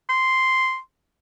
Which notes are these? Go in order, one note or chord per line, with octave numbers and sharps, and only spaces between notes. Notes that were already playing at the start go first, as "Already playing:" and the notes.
C6